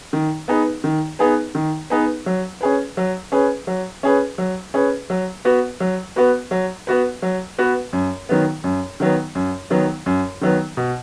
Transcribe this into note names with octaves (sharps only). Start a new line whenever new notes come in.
D#3
B3 D#4 G#4 B4
D#3
B3 D#4 G#4 B4
D#3
B3 D#4 G#4 B4
F#3
C#4 G#4 B4
F#3
C#4 G#4 B4
F#3
C#4 G#4 B4
F#3
C#4 G#4 B4
F#3
B3 F#4 B4
F#3
B3 F#4 B4
F#3
B3 F#4 B4
F#3
B3 F#4 B4
F#2
D#3 F#3 B3
F#2
D#3 F#3 B3
F#2
D#3 F#3 B3
F#2
D#3 F#3 B3
B2